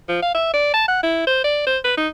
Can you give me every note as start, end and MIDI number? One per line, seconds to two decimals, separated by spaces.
0.08 0.18 53
0.22 0.33 77
0.35 0.52 76
0.54 0.70 74
0.74 0.88 81
0.88 1.00 78
1.03 1.25 64
1.27 1.41 72
1.44 1.63 74
1.66 1.78 72
1.84 1.95 71
1.97 2.08 63